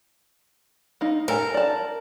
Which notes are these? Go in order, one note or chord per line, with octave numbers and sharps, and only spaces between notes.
A#3 D#4
A4 A#4 G#5
D5 A5